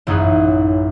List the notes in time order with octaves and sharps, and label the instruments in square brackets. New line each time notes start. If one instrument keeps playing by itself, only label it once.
[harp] A1 F#2 E3 D#4 G#4 B4